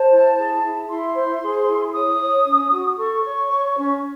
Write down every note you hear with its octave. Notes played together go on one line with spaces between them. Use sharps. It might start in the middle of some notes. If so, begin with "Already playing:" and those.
Already playing: C5 A5
E4
G#4
E4
E4 C6
C5
G#4
E4
C#5 D#6
C#5
C#4
F#4
A4 C#6
C#5
C#5
C#4